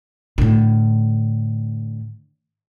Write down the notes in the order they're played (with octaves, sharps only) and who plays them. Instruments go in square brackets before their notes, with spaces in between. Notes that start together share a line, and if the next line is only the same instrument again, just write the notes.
[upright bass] A2 D3